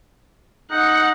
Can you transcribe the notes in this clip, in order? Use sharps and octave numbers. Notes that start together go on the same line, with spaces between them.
D#4 F#5